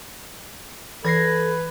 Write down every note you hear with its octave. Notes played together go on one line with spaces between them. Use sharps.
E3 A4 B4 G#6 A#6 C7